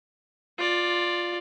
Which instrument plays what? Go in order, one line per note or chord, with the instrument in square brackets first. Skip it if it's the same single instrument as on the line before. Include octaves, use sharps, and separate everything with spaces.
[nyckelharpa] F4 D5